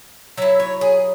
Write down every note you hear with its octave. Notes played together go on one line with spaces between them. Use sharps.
F#3 E4 E5
C#5
G#4